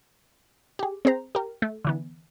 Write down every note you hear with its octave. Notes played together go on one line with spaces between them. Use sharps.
G4 G#4
C4 G#4 C5 A#5
G4 A#4
A3
D3 E3 B3